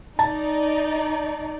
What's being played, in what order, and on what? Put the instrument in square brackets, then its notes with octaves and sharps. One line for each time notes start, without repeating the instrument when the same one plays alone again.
[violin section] D#4 D5 [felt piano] A5